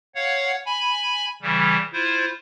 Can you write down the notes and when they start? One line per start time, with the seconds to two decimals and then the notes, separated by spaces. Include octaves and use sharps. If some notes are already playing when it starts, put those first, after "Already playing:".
0.15 C#5 F5 F#5
0.66 G#5 B5
1.42 C#3 E3 G3
1.93 E4 F4 C5